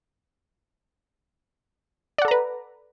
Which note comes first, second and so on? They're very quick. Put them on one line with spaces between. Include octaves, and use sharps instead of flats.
D5 F#5 A4 A#5 B4